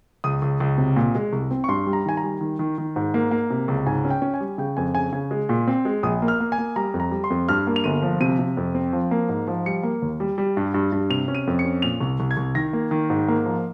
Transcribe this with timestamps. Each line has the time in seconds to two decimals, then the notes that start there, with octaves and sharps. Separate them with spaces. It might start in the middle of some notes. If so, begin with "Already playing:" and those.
0.24 C#2 D#6
0.42 C#2
0.60 C#2
0.78 C3
0.96 A#2
1.15 G#3
1.33 C2
1.51 C4
1.64 C#6
1.68 G2 C6
1.87 G3
1.93 A#5
2.06 D#3 G#5
2.17 A#5
2.23 G3
2.41 D#3
2.59 D#3
2.78 D#3
2.96 G#2
3.14 A#3
3.31 A#3
3.50 C3
3.68 C#2
3.86 G#2 G#5
4.05 C#4
4.10 G5
4.22 C#4
4.34 G#5
4.40 G3
4.58 C#3 G5
4.77 F2 G#5
4.94 C#3 G#5
5.13 C#3 G#5
5.31 G#3
5.49 A#2
5.67 C4
5.85 G#3
6.03 A#1 D#6
6.22 A#3
6.28 F6
6.40 A#3
6.52 G#5
6.58 A#3
6.76 G3 A#5
6.94 F2
7.00 A#5
7.12 G3
7.24 C6
7.30 F2
7.49 G2 F6
7.67 A#3
7.76 F7
7.84 G1 D#7
8.02 F3
8.21 C3 D#7
8.39 C3
8.57 F2
8.75 C4
8.93 F3
9.11 A#3
9.29 G#2
9.47 F3
9.66 G3 C#7
9.83 A#3
10.02 D#2
10.20 G3
10.38 G3
10.57 G2
10.74 G2
10.92 G2
11.10 C3 F7
11.28 C#4
11.35 D#7
11.47 F2
11.59 C#7
11.65 C#4
11.82 A#2 F7
12.01 C2
12.20 C2
12.31 G#6
12.37 C2
12.55 D#3 A#6
12.73 A#3
12.91 D#3
13.10 G#2
13.28 A#3
13.45 F3